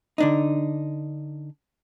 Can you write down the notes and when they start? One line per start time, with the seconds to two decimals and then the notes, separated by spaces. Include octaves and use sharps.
0.18 D3 D4 D#4